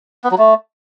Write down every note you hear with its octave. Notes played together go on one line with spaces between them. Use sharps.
B3
F#3
A3